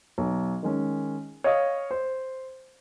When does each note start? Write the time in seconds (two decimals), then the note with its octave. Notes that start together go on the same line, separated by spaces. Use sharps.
0.18 B1
0.63 D#3 G#3 C#4
1.44 C#5 D#5 F5 D#6
1.91 C5